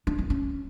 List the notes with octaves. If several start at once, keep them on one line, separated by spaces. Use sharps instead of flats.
D4
C4
C#4